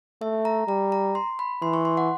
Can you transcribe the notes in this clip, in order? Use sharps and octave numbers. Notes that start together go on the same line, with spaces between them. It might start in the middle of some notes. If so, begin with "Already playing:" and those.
A3 E5
A#5
G3 A#5
A#5
C6
B5
E3 C6
C#6
C6
F#5